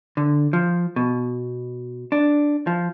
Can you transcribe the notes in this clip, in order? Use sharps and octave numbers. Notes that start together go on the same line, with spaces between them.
D3
F3
B2
D4
F3